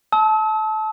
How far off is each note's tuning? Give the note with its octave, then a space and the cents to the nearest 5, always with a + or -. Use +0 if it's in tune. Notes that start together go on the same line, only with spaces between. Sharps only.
A5 -20 E6 -45